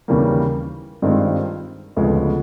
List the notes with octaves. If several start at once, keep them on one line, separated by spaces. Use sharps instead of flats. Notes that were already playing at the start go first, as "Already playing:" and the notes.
D#2 C#3 E3 G3 A#3
G2 D#3 G#3 C4 F4
D2 C#3 F3 G#3 B3